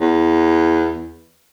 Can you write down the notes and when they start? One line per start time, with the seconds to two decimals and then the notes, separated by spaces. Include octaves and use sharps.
0.01 E2